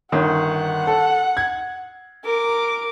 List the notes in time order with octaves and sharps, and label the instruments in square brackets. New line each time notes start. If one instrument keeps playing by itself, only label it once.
[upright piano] G1 D#3 C#4 [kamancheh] F#5
[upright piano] A4
G#6
[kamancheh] A#4 D6